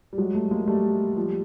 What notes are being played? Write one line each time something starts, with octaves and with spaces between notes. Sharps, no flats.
G3
F#3 G#3
G3 A3
G#3 A#3
G3 A3
F3 G3